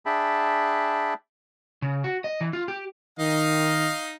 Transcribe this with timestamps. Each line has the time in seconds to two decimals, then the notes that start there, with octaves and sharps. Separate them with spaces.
0.06 D4 G#4 E5 G5 A5 B5
1.82 C#3
2.04 F#4
2.24 D#5
2.41 E3
2.53 F4
2.68 G4
3.19 D#3 D#4 D#5 F5